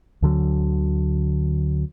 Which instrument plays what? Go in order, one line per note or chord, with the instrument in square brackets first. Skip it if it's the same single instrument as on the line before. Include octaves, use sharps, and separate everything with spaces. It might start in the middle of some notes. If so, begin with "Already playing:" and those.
[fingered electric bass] D2 D3 F#3